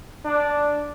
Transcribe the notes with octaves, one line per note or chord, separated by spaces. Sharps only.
D4